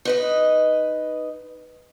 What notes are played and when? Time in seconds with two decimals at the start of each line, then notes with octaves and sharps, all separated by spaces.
0.05 D#4 B4 D#5